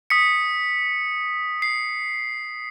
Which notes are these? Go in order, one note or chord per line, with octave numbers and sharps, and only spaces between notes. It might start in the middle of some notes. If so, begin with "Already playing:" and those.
D#6 B6 C#7
C7